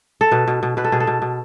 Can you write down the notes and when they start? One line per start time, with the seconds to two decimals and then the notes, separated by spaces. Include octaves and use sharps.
0.21 A4
0.31 B2 B4
0.48 B2
0.63 B2
0.77 B2 B4
0.84 A4
0.92 B2 G#4
1.00 A4
1.07 B2
1.22 B2